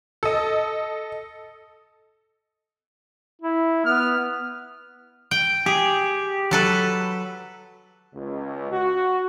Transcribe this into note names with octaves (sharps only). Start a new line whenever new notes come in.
A4 D#5
E4
B3 F6
G5
G4 G#4
F#3 A4 B4
C#2
F#4